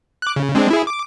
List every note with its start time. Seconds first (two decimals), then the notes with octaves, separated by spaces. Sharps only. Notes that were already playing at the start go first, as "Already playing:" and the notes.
0.22 D6 F#6
0.36 C#3
0.55 G#3 C4 D4
0.71 E4 G#4
0.87 D6